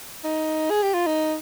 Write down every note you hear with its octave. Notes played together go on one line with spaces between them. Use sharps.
D#4
G#4
G4
F4
D#4